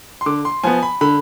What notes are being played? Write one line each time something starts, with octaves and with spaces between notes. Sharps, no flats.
C6
D3 D6
C6
F3 B3 G#5
B5
D3 B5